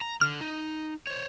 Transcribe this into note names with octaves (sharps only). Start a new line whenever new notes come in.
A#5
D3 F6
D#4
C5 C#5